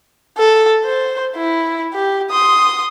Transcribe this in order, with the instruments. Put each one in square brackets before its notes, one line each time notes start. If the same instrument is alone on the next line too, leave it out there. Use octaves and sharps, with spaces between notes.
[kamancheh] A4
C5
E4
G4
C6 D#6